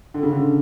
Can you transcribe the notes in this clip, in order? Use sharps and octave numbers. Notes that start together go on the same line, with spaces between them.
D3
C#3
D3